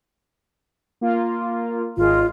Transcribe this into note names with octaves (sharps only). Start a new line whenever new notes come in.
A#3 F4
G#1 G#3 F4